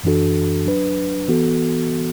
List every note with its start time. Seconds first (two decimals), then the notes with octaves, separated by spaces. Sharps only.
0.04 F#2 E3 D4 F#4 A4
0.65 F#3 D4 B4
1.28 E3 B3 F#4 A4